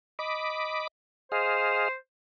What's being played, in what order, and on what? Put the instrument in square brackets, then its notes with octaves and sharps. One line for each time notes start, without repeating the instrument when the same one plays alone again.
[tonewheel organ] D#5 B5 D6
[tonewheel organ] G#4 D#5 F5 [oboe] C5